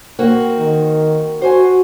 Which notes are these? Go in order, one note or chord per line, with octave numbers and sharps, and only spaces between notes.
A#3 C4 F#4
D#3
F#4 C5 G#5